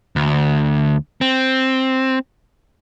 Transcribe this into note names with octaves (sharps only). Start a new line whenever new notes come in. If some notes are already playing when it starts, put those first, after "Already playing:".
D2
C4